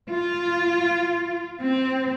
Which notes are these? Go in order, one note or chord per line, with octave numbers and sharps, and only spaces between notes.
F4
C4